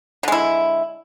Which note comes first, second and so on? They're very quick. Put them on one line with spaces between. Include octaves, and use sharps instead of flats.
D3 G#3 E4